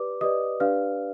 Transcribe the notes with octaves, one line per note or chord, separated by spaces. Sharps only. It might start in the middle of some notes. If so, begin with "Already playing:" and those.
Already playing: G4 B4 D5 D6
G4 B4 D5 D#5 D#6
D4 G4 B4 D5 F5 F6